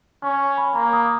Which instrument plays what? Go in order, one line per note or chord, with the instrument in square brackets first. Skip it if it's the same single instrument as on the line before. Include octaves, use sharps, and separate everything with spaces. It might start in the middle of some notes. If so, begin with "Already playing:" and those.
[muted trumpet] C#4 [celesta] C#6
[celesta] B5
[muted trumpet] A#3 [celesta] A#5
[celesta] D#6